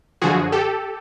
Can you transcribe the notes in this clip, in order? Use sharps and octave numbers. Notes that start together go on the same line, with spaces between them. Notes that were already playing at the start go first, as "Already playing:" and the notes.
F#2 D3 F3 F#4 G#4
G4 A4